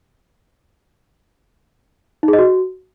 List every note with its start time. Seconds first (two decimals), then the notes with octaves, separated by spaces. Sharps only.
2.23 D#4
2.28 G#4
2.33 D#5
2.39 F#4